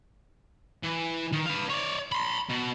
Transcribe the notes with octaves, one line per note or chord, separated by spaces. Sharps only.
E3
D#3
B4 F5
C#5 D5
B5 C6
B2